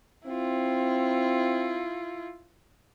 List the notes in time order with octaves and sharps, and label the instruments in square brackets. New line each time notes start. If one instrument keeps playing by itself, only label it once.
[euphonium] C4 [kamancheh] E4 F4